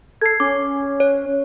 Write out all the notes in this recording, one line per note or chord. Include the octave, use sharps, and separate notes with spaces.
A4 G#6 C7
C#4 D6
C#5